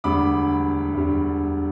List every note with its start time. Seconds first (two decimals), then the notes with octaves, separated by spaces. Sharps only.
0.04 E1 D2 D3 G3 B5 D6
0.94 E1 D2 D3 G3